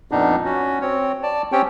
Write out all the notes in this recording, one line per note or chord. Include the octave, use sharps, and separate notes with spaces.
F2 A#2 B3 D4 D#4
C#4 F#4
C4 C#5
D5 A5
C4 C#4 G4 C#5 G5